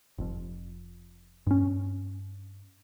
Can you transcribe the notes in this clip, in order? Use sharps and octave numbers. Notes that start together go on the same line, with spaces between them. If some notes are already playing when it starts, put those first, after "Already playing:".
F1 F2
G2 C#4